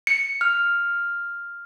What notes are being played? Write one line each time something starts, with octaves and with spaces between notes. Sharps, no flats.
C#7
F6